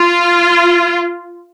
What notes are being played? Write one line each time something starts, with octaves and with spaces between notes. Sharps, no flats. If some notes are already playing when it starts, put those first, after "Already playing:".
Already playing: F4